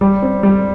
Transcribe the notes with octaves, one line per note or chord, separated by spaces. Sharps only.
G3
C4
G3